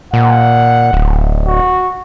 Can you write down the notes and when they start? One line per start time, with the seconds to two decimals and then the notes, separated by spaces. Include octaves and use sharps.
0.13 A#2 F#5
0.93 D1
1.46 F#4